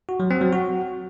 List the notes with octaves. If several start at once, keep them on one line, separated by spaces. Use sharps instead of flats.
F#4
F#3
C4
F#3
F#4